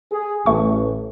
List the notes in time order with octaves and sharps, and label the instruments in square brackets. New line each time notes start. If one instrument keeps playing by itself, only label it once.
[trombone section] G#4
[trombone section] A1 [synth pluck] A3 C#6